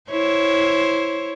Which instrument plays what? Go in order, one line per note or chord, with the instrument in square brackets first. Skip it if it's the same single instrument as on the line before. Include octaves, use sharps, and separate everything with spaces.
[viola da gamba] E4 C5 C#5